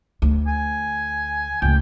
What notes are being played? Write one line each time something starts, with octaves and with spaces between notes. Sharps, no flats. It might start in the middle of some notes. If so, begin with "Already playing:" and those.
D2
G#5
C#2 A2 G5